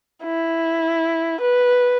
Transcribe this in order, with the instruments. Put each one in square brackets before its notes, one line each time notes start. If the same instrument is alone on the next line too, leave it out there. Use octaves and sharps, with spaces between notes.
[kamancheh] E4
B4